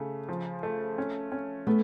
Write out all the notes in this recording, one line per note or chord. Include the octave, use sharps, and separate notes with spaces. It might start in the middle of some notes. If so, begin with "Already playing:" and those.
Already playing: C#3 A3
F3
A3
C#4
C#4
A3 B3